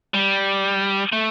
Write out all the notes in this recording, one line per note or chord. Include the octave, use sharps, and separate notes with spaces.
G3
A3